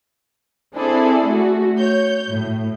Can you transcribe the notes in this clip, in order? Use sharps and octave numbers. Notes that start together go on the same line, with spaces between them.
C4 D4 E4 G#4 A4 D5
A3 F#4
C#5 G6
A2